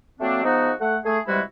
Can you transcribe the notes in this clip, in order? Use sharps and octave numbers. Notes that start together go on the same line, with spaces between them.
F#3 A3 A#3 C4 D4
F3 G#3 B3 D#4 F#4
A3 F#5
A3 G#4
C3 E3 G3 G#3 E4 F#4